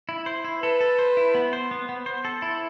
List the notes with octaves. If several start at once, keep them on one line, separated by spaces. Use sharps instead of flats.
E4
C5
E4
A4 B4
A4
C5
E4
B3
C5
B3
B3
C5
A4
E4